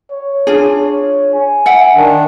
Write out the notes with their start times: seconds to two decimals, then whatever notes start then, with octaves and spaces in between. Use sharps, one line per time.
0.11 C#5
0.47 D4 F4 G#4
0.78 C#5
1.34 G#5
1.66 E5 F#5 G5
1.95 D#3 D4